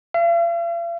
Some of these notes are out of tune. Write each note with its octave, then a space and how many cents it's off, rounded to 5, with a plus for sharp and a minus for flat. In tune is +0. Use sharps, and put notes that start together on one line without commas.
F5 -45